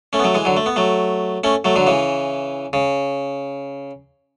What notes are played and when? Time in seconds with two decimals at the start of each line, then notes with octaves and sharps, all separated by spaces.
0.13 A3 C#4
0.19 B3
0.24 F#3 A3
0.35 E3 G#3
0.45 D3 F#3
0.57 A3
0.66 B3
0.76 F#3 A3
1.44 A3 C#4
1.65 F#3 A3
1.76 D3 F#3
1.87 C#3 E3
2.73 C#3